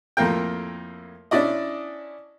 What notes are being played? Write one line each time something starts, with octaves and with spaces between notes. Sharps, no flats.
F2 A2 A#3 A#4 G5
C#4 D4 E4 D5 D#5